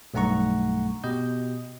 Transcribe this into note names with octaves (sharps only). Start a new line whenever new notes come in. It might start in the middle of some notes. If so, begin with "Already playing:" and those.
B1 G2 A3 F#5 A#5 C#6
B2 G4 D#5 G6